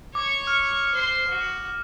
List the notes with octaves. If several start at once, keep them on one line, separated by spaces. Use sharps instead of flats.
C#5 C#6 D6
F6
C5 C6
F#4